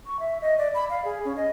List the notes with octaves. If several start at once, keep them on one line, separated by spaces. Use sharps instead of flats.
C#6
E5
D#5
D5
B5
F5
G#4
C#4
D#5